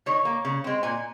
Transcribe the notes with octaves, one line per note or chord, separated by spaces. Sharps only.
D#3 C#5
A#3
C#3
G#3 C4
A#2 G#5